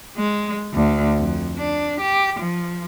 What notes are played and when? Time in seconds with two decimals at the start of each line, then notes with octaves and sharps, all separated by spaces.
0.17 G#3
0.74 D2
1.19 F2
1.58 D4
2.00 G4
2.40 F3